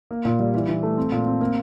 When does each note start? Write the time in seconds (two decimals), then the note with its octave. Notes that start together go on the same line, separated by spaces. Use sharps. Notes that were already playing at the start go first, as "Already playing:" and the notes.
0.11 A#3
0.25 A#2
0.39 G3
0.54 E3
0.69 E3
0.83 A3
0.97 C4
1.12 A#2
1.26 C4
1.41 A#3